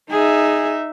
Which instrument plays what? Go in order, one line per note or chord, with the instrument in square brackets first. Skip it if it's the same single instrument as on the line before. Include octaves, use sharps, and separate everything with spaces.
[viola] D#4 E5 [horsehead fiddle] G#4